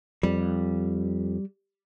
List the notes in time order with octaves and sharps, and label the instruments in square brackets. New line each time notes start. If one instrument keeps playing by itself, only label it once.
[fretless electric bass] F2 [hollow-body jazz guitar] G3